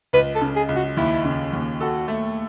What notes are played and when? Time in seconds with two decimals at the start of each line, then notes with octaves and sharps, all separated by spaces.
0.13 C#2 B4
0.35 A4
0.41 C#3
0.56 G#4
0.69 C#2
0.76 F#4
0.97 D#2 E4
1.25 C#3
1.53 D#2
1.80 F#4 A4
2.08 A3